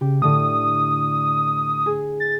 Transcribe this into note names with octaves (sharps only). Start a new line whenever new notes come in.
C#3 G4
A2 D3 A3 D#6
G#4
A6